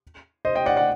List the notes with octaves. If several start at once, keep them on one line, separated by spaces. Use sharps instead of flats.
C5 D#5
D#5 G5
D5 F#5
D5 F#5